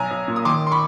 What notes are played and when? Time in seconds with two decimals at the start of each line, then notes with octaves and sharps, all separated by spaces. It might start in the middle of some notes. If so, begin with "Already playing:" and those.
Already playing: B1 G#5 A#5
0.11 B1
0.28 A#2
0.36 D#6
0.45 D#3 C6 D6
0.67 C6
0.71 B5 C#6